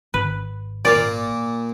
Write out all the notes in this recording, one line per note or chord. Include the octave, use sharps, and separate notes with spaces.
G#1 B4
A#2 A#3 D5 F5